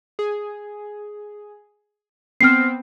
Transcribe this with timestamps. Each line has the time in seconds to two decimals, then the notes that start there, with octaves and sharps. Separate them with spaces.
0.19 G#4
2.41 B3 C4 F6 C7